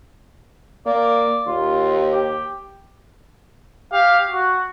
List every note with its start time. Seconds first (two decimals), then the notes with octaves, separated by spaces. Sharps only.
0.86 A#3 D5
1.47 D#2 F4
2.12 G4
3.91 G4 F5
4.30 F#4